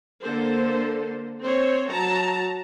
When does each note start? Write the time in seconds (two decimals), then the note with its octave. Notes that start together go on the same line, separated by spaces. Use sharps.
0.24 D3 A#3 A4 C5
1.42 C4 C5 C#5
1.89 F#3 A5 A#5